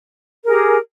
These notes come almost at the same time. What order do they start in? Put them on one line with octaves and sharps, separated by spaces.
A#4 G#4 G4